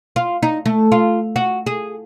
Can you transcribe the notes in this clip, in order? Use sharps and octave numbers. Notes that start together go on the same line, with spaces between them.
F4
D#4
A3
F4
F#4
G#4